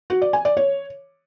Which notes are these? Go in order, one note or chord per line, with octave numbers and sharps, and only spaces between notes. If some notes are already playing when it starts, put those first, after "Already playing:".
F#4
D5
G#5
D5
C#5